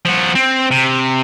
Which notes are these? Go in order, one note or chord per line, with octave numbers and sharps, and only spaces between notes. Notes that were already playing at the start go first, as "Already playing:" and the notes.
F3 F#4
C4
C3